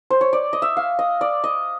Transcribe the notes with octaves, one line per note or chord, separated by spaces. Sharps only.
C5
C#5
D5
D#5
E5
F5
D#5
D5
D#5